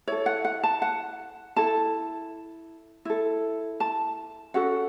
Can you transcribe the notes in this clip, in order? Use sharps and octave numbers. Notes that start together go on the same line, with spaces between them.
E4 A4 C#5
F#5
F#5
A5
F#5
E4 A4 A5
E4 A4
A5
C#4 F#4 A4 F#5